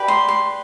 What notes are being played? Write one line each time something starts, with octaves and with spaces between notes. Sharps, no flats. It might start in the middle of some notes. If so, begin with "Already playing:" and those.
Already playing: G4 B4 D5
C6
C6